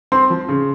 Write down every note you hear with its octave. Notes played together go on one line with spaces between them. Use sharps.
C4 C6
F3
C#3